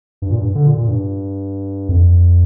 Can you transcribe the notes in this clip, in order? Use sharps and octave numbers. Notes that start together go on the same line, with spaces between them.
G2
A#2
G2
D3
A#2
A#2
G2
F2